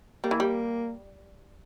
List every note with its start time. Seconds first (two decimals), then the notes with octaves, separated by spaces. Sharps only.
0.24 G3 A#3
0.31 E3
0.40 G3